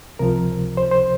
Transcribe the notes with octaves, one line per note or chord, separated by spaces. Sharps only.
C#2 C3 F3 A#4
C5
C5